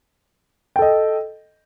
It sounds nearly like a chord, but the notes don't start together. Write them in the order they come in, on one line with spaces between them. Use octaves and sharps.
G5 A4 D#5